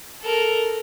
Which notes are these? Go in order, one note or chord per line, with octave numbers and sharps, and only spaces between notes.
A4 A#4